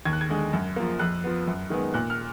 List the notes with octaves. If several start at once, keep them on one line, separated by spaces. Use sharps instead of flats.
D#2 G#6
F#6
G#6
D3 G#3
F#2
F3 A#3
F2 F#6
F3 B3
F#2
D#3 G#3 B3
A#2 F#6
F6